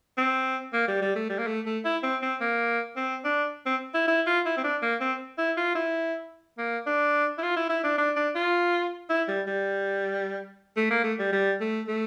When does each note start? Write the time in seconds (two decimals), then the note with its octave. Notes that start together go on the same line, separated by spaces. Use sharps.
0.18 C4
0.73 A#3
0.88 G3
1.02 G3
1.16 A3
1.30 G3
1.39 A#3
1.47 A3
1.66 A3
1.85 E4
2.03 C4
2.22 C4
2.41 A#3
2.96 C4
3.24 D4
3.66 C4
3.94 E4
4.08 E4
4.27 F4
4.46 E4
4.57 C4
4.64 D4
4.82 A#3
5.01 C4
5.38 E4
5.57 F4
5.75 E4
6.58 A#3
6.86 D4
7.38 E4
7.43 F4
7.57 E4
7.70 E4
7.84 D4
7.98 D4
8.16 D4
8.35 F4
9.09 E4
9.28 G3
9.47 G3
10.77 A3
10.91 A#3
11.04 A3
11.19 G3
11.33 G3
11.61 A3
11.88 A3